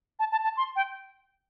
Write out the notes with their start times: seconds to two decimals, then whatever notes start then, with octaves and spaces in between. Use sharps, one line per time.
0.19 A5
0.32 A5
0.44 A5
0.57 C6
0.76 G5